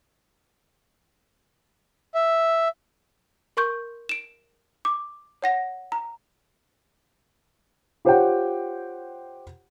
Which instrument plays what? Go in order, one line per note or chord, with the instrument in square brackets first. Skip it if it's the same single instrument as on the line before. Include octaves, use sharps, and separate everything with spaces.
[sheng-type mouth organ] E5
[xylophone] A#4 C6 C#6 G6
D7 E7
D6
C#5 F#5 A#6
A#5
[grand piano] F4 G4 C5 C#5 F#5 G5